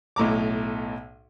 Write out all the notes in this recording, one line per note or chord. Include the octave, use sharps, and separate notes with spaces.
B1 A2 A#5 D6